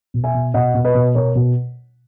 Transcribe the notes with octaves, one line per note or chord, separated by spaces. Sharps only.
B2
E5 G#5
B2
B2 D#5 F#5
B2
B4 D#5
B2
B2 A#4 C#5
B2